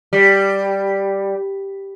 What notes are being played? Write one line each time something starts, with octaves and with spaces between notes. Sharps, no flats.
G3